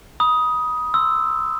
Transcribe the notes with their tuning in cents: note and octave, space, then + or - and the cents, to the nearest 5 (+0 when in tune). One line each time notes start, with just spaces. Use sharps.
B5 -25 D#6 +10
C6 -5 E6 +0